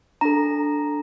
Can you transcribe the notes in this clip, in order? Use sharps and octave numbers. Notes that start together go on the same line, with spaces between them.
D4 A4 A#5